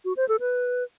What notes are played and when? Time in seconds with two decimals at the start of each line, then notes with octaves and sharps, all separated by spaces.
0.05 F#4
0.17 C5
0.28 A4
0.40 B4